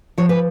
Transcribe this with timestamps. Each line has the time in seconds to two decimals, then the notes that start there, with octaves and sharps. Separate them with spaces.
0.18 F3 C#5
0.29 B4